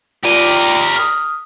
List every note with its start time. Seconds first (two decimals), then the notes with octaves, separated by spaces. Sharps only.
0.24 F4 G4 A#4 D5 D#7
0.96 D#6 F6